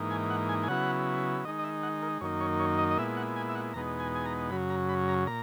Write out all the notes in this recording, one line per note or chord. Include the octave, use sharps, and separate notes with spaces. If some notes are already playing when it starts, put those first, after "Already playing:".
Already playing: G#2 E3 A#3 D#4
G#5
F#5
G#5
G#5
C#3 F#3 B3 E4 F#5
D#3 G#3 D#4 D#5
D#5
E5
F#5
A#4
F#2 D#3 A#3 D#4 C#5
C#5
C#5
D#5
D#5
A#2 G#3 B3 E4 E5
F#5
G#5
E5
F#5
E2 B2 G#3 B3 D#4 A#5
G#5
G#5
A#5
F#2 C#3 F#3 B5
A#5
B5
A#5
A#2 A#5